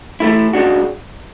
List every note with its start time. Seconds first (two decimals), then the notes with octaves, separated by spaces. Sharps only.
0.20 E3 A3 E4
0.53 C#3 G#3 D4 F#4